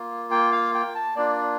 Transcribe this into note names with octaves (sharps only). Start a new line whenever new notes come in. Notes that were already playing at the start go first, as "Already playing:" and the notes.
Already playing: A#3 F4
G5
F5
G5
A5
A#3 D4 F4 D5